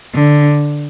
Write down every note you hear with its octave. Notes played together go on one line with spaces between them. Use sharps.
D3